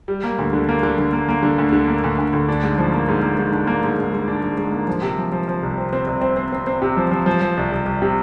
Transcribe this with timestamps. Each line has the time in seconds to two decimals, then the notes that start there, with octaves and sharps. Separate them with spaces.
0.08 G3
0.24 A#3
0.39 D2
0.53 D3
0.69 A#3
0.83 D3
0.98 D3
1.13 A#3
1.29 A#3
1.43 D3
1.58 D2
1.73 D3
1.88 A#3
2.04 D2
2.18 D2
2.33 D2
2.49 D4
2.63 G#2
2.78 F3
2.92 A#3
3.08 G#2
3.22 A#3
3.38 G#2
3.52 D4
3.67 A#3
3.83 G#2
3.98 G#2
4.13 G#2
4.28 D4
4.42 G#2
4.58 G#2
4.72 A#3
4.88 F3
5.02 C3
5.18 F3
5.32 F3
5.48 F3
5.63 C2
5.78 C4
5.93 C4
6.07 C2
6.21 C4
6.37 C4
6.53 C4
6.67 C4
6.82 C3
6.97 F3
7.11 F3
7.26 F3
7.42 F3
7.57 C2
7.72 C2
7.86 C2
8.02 C3